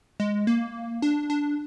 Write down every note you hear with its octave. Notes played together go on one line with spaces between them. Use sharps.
G#3
A#3
D4
D4